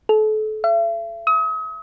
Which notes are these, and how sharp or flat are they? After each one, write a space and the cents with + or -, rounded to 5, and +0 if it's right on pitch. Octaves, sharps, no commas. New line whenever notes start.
A4 -35
E5 +40
D#6 +40